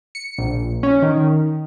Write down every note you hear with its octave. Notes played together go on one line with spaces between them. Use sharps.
C#7
A#1
C#4
D#3